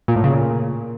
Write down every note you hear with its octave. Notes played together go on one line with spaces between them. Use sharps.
A#2
A2
C#3
A#2